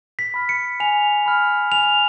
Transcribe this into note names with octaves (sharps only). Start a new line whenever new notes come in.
B6
B5 F6
C#7
G#5 F7
B5 F6
G#5 F7